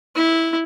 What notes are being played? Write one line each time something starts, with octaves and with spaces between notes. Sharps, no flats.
E4